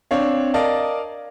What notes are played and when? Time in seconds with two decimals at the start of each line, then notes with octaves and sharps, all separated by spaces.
0.11 C4 D4 C#5 F5
0.54 A#4 D5 D#5 F5 A5